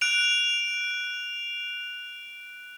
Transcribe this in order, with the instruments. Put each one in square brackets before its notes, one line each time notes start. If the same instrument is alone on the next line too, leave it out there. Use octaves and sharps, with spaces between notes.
[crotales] F#6 D7 F7